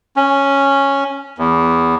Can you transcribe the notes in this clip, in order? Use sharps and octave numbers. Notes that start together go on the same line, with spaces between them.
C#4
E2